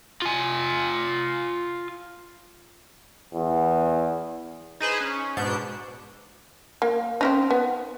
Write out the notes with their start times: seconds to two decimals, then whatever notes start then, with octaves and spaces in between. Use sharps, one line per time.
0.22 F4 G#5
3.34 E2
4.80 D#4 G#4 B4 C5
5.01 C#4
5.37 G#2 B2 D4 G6 C#7
6.82 A#3
7.21 C4 C#4 D#4
7.50 B3